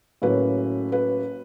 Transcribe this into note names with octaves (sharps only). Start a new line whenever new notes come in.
A2 F#3 A#3 C#4 B4
B4